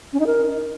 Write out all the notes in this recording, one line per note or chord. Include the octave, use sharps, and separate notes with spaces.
C#4
D#4
A#4